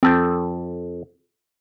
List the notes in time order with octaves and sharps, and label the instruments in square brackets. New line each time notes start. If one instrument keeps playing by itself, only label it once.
[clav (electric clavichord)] F2 A4 G5 [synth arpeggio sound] C4